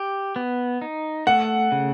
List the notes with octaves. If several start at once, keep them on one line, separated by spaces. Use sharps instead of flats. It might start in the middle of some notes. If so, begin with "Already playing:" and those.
Already playing: G4
B3
D#4
A3 F#5
C#3